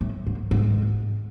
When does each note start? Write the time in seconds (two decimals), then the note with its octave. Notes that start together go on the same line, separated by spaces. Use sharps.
0.01 A2
0.27 G#2
0.51 G#2